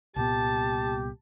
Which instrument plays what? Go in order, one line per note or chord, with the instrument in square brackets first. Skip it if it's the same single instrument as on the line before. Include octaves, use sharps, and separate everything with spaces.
[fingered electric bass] C2 A#2 B3 [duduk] G4 [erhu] A5